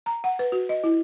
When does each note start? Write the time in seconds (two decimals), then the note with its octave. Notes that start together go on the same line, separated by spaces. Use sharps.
0.06 A#5
0.24 F#5
0.39 B4
0.52 F#4
0.69 D#5
0.84 E4